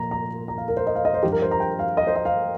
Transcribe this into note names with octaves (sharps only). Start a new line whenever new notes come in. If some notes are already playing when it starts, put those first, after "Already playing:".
Already playing: A#2 F3 A#5
A#5
A#5
F5
A#4
C5
D#5
F5
D#5
C5
G2 F3 G4
A#4
C5
A#5
G5
F5
D#5
C5
D#5
F5